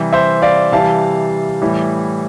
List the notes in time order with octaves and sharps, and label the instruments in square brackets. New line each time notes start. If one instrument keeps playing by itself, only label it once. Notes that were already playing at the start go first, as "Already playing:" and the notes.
Already playing: [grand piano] C3 E3 G3
C5 E5
D5 F5
C3 E3 G3 F5 A5
A2 E3 G3